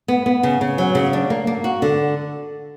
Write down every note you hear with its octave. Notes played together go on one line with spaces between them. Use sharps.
B3
B3
C#3
C#3
F#3
C#3
D4
A#3
A#3
F#4
D3